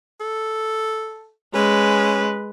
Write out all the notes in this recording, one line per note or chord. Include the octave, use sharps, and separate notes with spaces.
A4
G#3 C#4 B4